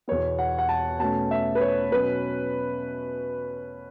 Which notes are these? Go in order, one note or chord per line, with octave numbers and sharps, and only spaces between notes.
E2 B2 B3 C#5
F#5
F#5
A5
B2 A3 C#4 A5
E5
B4
C#5
B2 F#3 C#4 B4